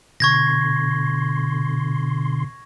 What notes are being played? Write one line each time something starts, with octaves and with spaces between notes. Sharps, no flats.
B2 D3 C6 C#6 G#6 A#6